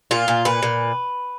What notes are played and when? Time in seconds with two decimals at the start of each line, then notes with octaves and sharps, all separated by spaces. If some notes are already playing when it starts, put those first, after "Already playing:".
0.11 A#2 F4
0.28 A#2
0.45 A#2 B4
0.63 A#2